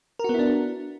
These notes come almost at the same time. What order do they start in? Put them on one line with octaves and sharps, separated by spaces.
A#4 F#4 B3 E4 D4